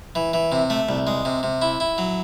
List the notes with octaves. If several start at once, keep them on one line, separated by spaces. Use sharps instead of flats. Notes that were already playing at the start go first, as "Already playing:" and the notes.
E3
E3
C3
A3
C2
G#3
C3
C3
E4
E4
F#3